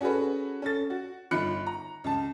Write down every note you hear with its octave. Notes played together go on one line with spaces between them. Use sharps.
C#4 F#4 G#4 A4 B4
C#4 A4 A6
F#4
G1 D#4 F4 B5 F#6 C#7
A#5
C#2 A5